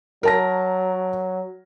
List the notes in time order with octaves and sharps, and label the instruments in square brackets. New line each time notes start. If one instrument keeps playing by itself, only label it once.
[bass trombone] F#3 [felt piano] A#4 A5 A#6